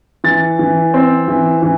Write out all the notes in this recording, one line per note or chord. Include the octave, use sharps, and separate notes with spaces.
E3 A6
E3
C4
E3
E3